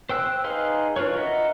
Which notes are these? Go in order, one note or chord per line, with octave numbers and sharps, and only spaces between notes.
C5 G5 E6 F#6
D#4 G#4 B4 F5 C6
D4 F4 A#4 B4 C#5
F4 A#4 D#5 E5 F#5